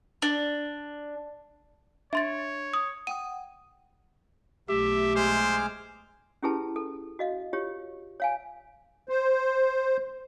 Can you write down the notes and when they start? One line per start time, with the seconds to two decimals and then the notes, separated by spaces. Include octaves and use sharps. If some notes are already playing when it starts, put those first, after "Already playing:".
0.22 D4
2.13 D4 C#5 E5 C6 A6
2.74 D#6
3.07 F#5 G5 D#6 D#7
4.69 B1 A3 G4 E5
5.16 G#3 C5 D6 F6
6.43 C#4 E4 G4 G#4 B4 A5
6.76 A4
7.19 F#4 D#5 F5
7.53 F4 G4 C#5
8.20 C#5 F5 G#5
9.09 C5